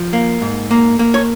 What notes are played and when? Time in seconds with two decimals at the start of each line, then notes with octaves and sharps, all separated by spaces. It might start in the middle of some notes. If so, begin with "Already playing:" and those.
Already playing: F3
0.13 A#3
0.42 G#2
0.71 A#3
0.99 A#3
1.14 C#5